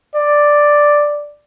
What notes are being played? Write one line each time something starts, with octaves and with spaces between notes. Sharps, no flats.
D5